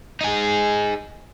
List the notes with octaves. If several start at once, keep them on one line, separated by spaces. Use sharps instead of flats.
D#4 G#4